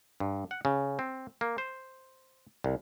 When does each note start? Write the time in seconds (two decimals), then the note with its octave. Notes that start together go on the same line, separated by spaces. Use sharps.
0.20 G2
0.51 F#5
0.65 C#3
0.99 C4
1.41 A#3
1.58 C5
2.64 C2